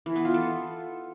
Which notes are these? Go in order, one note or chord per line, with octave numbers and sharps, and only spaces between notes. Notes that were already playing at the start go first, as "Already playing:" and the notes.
E3
B3
F4
A4